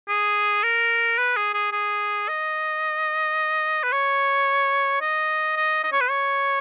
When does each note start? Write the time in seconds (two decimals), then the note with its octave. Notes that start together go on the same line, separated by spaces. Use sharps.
0.08 G#4
0.63 A#4
1.18 B4
1.37 G#4
1.54 G#4
1.72 G#4
2.28 D#5
3.83 B4
3.92 C#5
5.01 D#5
5.56 D#5
5.84 D#5
5.92 C#5
6.01 B4
6.10 C#5